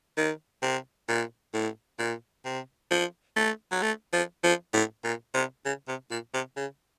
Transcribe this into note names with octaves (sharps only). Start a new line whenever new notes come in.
D#3
C3
A#2
A2
A#2
C3
F3
A3
F#3
A3
F3
F3
A2
A#2
C3
C#3
C3
A#2
C3
C#3